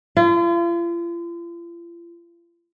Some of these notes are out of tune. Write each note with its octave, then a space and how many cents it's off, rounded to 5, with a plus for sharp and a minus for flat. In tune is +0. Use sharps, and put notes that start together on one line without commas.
F4 -40